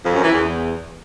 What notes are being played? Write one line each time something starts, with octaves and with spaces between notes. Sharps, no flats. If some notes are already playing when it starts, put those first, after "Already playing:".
F2
F#2
E3
E2